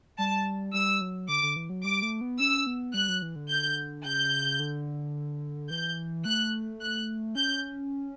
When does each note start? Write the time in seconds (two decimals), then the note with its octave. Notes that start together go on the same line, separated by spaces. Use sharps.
0.18 G3 A5
0.74 G3 E6
1.01 F#3
1.28 D3 D6
1.43 D3
1.56 E3
1.69 F#3
1.84 G3 D6
2.02 A3
2.21 B3
2.39 C#4 E6
2.67 B3
2.94 G3 F#6
3.09 F#3
3.22 E3
3.36 D3
3.49 G6
4.05 C#3 G6
4.59 D3
5.70 E3 G6
6.25 A3 F#6
6.81 F#6
7.35 C#4 G6